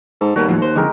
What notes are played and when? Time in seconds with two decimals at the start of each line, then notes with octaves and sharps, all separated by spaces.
0.21 G#2 A4
0.36 D#2 G3 A#3 B3 F#4
0.48 A2 F3 F#3
0.62 C5
0.76 F2 D3 E3 G#3 G4 A#4